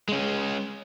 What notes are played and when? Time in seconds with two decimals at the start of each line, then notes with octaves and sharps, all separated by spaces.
0.09 G#3 C#4